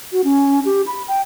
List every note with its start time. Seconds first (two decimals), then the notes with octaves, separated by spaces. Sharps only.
0.12 F#4
0.24 C#4
0.65 G4
0.87 B5
1.08 G5